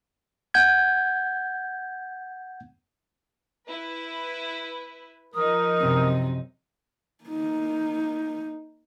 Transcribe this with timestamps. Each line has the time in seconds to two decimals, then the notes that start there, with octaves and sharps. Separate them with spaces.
0.54 F#5 G6 G#6
3.67 E4 B4
5.34 F3 D#4 A#4 D#6
5.80 F#2 C3
7.24 A#3 D#4